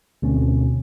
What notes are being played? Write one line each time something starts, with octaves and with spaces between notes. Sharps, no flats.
D2 B2 C4 C#4